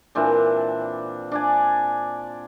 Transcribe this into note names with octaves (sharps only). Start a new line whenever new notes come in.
A#2 E3 C4 D4
D4 D5 G#5